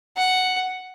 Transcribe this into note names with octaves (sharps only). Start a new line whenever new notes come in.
F#5